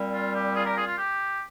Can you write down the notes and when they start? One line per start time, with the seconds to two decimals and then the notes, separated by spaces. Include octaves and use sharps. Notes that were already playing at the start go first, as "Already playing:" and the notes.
Already playing: A#2 G3 C4
0.13 F4
0.35 G4
0.56 F4 G#4
0.66 G4 A#4
0.77 F4 G#4
0.87 F4
0.98 G4